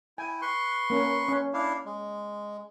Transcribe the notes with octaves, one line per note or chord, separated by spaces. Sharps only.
E4 G5 G#5
B4 C6 C#6
A#3 C#4
C#4
D4 E4 F5
G#3